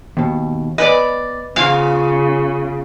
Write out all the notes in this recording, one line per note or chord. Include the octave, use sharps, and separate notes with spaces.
D#2 B2
B3 B4 D5 D#5
C#3 B3 F4 F5